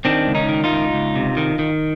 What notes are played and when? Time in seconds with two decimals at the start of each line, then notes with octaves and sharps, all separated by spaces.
0.05 D#3 C4 D4
0.27 C#2
0.35 C#4 D#4
0.49 D#3
0.64 D#4 F4
0.72 C#2
0.93 C#2
1.16 C3
1.37 D#3
1.59 D#3